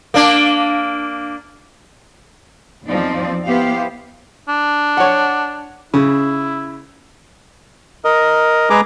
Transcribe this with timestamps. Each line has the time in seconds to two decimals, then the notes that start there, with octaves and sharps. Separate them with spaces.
0.14 A#3 D4
2.85 E2 F3 C4 D#4 D5
3.47 B3 E4 G4 C5 F5
4.49 D4
4.97 C#5 F#5
5.94 C#3 E4
8.05 A#4 D#5
8.70 G#3 G#4 B4 A#5 D6